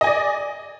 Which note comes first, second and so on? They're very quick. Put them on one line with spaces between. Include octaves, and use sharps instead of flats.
D#5 G#5 D5